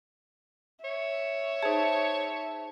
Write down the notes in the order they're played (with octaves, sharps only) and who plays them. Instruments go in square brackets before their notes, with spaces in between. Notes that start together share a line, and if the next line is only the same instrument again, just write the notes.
[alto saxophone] C#5 [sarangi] E5
[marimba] D#4 G#4 [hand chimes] C5 A5